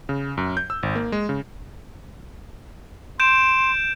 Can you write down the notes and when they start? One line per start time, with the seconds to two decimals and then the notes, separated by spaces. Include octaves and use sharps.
0.09 C#3
0.37 F#2
0.57 G6
0.70 E6
0.83 G#1
0.95 A#3
1.12 G#3
1.29 C#3
3.20 C6 G6 D7 E7